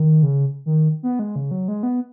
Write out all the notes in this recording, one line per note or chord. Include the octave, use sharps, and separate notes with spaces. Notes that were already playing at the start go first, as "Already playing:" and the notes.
Already playing: D#3
C#3
D#3
B3
G#3
C#3
F#3
G#3
B3